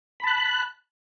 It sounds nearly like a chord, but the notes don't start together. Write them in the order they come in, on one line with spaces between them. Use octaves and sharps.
B5 A5 F#6